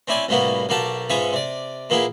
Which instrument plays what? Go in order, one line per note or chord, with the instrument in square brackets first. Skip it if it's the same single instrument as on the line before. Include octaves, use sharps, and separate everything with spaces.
[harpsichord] C4 C#4 E4 D5 G#5
C2 A2 G3 A#3 B3 F#4
B1 A#3 F#4 G4 A5
G#2 B3 C#4 F4 E5 C#6
C3 D5
A#2 A#3 B3 E4 G#4